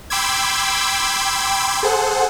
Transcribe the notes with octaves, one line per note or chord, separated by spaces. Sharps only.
G5 B5 C6 D6 E6 G#6
G#4 A4 C5 F#5